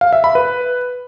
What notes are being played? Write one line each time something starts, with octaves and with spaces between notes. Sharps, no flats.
F5
E5
B5
B4